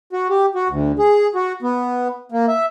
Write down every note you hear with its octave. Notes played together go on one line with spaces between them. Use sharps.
F#4
G4
F#4
D2
G#4
F#4
B3
A#3
E5